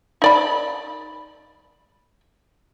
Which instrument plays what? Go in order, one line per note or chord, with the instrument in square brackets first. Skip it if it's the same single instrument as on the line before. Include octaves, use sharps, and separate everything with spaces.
[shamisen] D#4 D5 B5